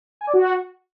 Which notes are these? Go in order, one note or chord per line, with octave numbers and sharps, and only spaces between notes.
G#5
D5
F#4